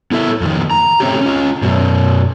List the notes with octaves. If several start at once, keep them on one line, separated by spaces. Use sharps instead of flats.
B3 E4 A4 E5
F2 D#3
A#5
A3 C4 C#4 G4
C#4 F4
F#2 B2